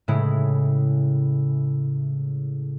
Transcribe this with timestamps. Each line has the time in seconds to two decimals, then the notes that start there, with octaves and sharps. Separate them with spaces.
0.08 A2 C#3 G#3 E4